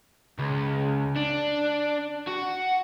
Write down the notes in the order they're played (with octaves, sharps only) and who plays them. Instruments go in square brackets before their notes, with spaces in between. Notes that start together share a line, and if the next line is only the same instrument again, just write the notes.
[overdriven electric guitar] C#2
D4
F#4